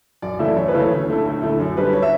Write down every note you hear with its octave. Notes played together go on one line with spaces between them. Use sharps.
F#2 D5
C#3 E3 A3 E4 E5
F#2 C#5
B4
C#3 E3 A3 E4
C#5
D2
D3 A3 E4
D2
D3 A3 E4
F#2
D3 G3 B4
C#5
E5